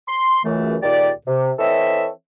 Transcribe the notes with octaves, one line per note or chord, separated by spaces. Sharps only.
C6
C#2 F#2 E3 A3
C#2 A#2 D#3 G4 D5
C3
E3 C4 A4 C#5 D#5 E5